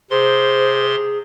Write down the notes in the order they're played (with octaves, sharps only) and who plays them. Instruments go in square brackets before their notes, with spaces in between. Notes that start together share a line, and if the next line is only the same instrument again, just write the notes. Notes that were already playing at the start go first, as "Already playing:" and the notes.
[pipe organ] C3 C6 [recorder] G#4 [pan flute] C5